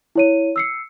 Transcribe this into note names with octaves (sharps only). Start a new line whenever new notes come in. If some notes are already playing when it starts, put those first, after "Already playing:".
E4 C#5 D#7
E6 C7 C#7